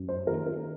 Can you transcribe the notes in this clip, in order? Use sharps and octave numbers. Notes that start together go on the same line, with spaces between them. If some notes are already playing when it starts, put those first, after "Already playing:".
Already playing: F#2
C5
D#3 A#3 A#4
A#4